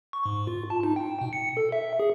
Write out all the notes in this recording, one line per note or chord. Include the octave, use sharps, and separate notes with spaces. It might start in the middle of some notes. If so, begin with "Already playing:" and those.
C#6
G#2
F4
A5
D#4
G5
B2
C#7
A4
E5
G#4